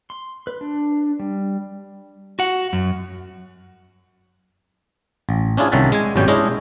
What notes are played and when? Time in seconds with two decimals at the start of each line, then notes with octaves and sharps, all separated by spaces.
0.10 C6
0.47 B4
0.61 D4
1.20 G3
2.39 F#4 F#5
2.73 F#2
5.29 A1
5.57 C#4 D4 E4 F4 G#4
5.72 C2 D#3 C#4 E5 F#5 A5
5.92 G#3 G#5
6.16 G#1 F#2 B2 G3 C#4 G5
6.28 G#3 C#4 D4 E4 D#5